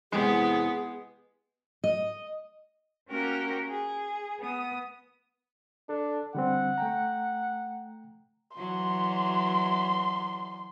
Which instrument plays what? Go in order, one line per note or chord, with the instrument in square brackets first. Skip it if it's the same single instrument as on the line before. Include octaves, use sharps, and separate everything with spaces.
[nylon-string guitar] E2 C3 [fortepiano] G#3 G4 [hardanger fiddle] B3 [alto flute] G#4
[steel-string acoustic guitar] D#5
[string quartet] A#3 C#4 F#4 G4 A#4
G#4
B3 D#6
[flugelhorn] D4 [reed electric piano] A4
[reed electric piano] D3 G3 C4 [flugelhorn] F#5
[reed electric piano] A3 G5 A#5
[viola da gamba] E3 F#3 [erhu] C6